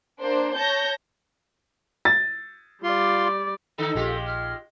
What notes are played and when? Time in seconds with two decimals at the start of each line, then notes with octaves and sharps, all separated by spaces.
0.20 A#3 D4 C5
0.57 C#5 A5 G6 A#6
2.05 A6
2.83 G3 F4 D5 C6
3.78 D3 D#4 A4
3.95 A#1 G#3 F4 G4
4.26 F6